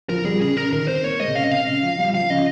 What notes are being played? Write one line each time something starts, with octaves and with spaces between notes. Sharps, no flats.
F3 A#4
G3 G#4
C#3 G#4
C#3 A#4
D#3 A#4
C4 C5
A#3 C#5
G#3 D#5
C3
C#3 F5
D#5
C3 F5
C#3
F3
G3
F3 F5
C#3 D#5